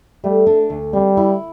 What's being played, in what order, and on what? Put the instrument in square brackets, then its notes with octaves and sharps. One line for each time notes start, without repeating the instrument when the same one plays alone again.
[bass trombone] G3 [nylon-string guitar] A3
[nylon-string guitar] D4
D2
[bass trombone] G3 [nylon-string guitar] C4
[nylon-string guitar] E4